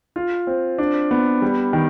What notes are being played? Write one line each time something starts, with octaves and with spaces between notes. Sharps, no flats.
F4
C4
D4
B3
G3
D#3